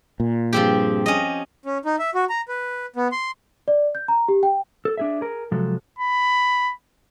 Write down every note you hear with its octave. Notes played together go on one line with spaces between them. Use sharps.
A#2
G2 F3 C4 G4 G#4
C#4 D#5
C#4
D#4
E5
F#4
A#5
B4
B3
C6
D5
G6
A#5
G4
G5
A4
D4 G#4 E5
G#4 A#4
C3 F3 F#3 G#3 A4
B5